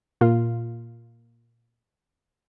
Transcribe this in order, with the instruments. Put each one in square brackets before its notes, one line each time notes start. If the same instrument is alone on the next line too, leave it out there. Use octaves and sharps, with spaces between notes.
[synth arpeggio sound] A#2 F4